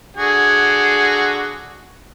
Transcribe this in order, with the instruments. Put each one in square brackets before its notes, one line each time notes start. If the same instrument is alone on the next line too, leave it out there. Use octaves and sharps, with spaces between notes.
[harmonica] D3 F#4 G#4